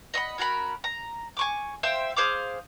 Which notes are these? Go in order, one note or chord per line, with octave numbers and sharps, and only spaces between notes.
D#5 E5 F#5 B5
C#4 F#4 A#4 B5
A#5
G#5 C#6 D6
C5 E5 F5 G5
G#4 C5 F5 D6